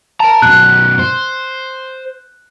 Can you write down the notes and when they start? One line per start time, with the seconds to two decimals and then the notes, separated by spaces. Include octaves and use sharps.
0.20 A#4 A5 A#5
0.42 F#2 B2 F#6
0.99 C5